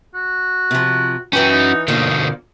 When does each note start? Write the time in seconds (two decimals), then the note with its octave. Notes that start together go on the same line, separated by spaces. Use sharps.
0.14 F#4
0.71 C3 F3
1.33 E3 C#4 F#4 B4 C#5 G5
1.50 D#4
1.88 F2 B2 D3 A#3 D4 D#4